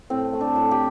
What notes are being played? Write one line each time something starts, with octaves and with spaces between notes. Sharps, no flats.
A2 C4
A3
D4
A2
G4